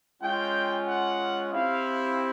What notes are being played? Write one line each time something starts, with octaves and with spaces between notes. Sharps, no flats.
G#3 C#4 F4 G5
F#5
C4 E4 G4 F5